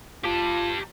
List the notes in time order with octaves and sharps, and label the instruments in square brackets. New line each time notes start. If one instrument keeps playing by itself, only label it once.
[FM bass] F1 [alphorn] F4 [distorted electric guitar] G4 A5